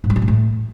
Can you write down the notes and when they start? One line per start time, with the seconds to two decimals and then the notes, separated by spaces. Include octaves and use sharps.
0.04 G#2
0.10 G3
0.16 G#2
0.22 B2
0.28 A2